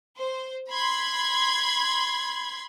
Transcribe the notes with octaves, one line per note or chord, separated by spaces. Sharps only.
C5
B5 C6 G#6